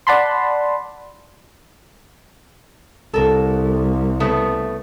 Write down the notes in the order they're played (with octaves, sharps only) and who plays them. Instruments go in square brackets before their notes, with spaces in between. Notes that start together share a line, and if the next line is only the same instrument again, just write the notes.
[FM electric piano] D5 F#5 A5 B5 C6
[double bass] C2 [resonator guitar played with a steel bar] A4 A#4
[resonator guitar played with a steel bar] C#3 A3 B3